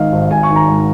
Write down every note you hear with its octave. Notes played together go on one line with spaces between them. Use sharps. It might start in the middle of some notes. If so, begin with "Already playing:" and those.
Already playing: G#1 G#2 D#3 D#4 D#5 F5
G#1
G#1 G#5
C#6
D#3
A#5
G#2